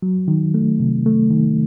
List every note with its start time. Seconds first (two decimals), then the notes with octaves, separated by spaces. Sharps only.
0.02 F#3
0.28 D#3
0.54 A3
0.80 C3
1.06 A3
1.31 D#3